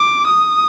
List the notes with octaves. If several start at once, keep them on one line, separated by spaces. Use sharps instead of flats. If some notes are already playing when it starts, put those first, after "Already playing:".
Already playing: D6
D#6